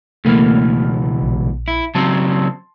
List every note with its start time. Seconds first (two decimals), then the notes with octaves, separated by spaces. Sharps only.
0.25 C#2 B2 E3 A3 A#3 F6
1.22 A#1
1.68 E4
1.95 C#3 F#3 C4 A5 C6